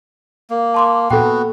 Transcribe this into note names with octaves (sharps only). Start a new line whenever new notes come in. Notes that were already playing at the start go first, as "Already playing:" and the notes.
A#3
A5 C6 D6
A#2 B3 F#4 A4 G5